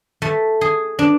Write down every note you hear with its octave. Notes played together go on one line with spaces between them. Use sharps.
A3
G#4
D4